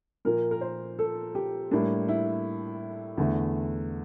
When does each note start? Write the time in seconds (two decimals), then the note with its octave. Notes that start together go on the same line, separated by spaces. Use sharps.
0.25 A#2 F3 A#3 A#4
0.51 A#4
0.61 C5
0.99 A4
1.35 G4
1.71 A2 G3 A#3 D4
2.08 E4
3.18 E2 D3 A3